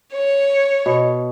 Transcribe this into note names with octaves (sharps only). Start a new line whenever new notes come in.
C#5
B2